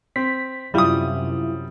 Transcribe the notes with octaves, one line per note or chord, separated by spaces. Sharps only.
C4 B6
F#2 C3 F#3 G3 E4 F4 D#6